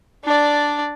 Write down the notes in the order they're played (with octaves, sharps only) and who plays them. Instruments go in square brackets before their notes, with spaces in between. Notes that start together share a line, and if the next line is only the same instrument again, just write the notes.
[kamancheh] D4 D5